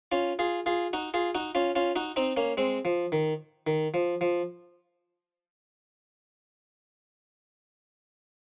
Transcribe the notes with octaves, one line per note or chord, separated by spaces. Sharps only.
C#4 F4
F4 G#4
F4 G#4
D#4 F#4
F4 G#4
D#4 F#4
C#4 F4
C#4 F4
D#4 F#4
C4 D#4
A#3 C#4
G#3 C4
F3
D#3
D#3
F3
F3